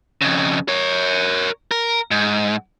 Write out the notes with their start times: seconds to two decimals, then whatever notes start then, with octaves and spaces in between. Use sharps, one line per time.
0.22 F2 C#3
0.68 A#4 C#5
1.71 A#4
2.11 G#2